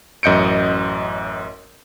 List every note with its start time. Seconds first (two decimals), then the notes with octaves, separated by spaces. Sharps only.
0.23 A1 F#2 D#5 G6 C#7 D7